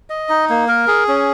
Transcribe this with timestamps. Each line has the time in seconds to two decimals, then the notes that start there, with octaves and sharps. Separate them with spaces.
0.10 D#5
0.29 D#4
0.50 A#3
0.68 A#4
0.88 G#4
1.08 C#4